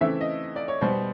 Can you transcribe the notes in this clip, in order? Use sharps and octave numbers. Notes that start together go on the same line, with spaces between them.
C#3 E3 A3 C4 E5
D#5
D5
C#5
B2 G3 B3 C5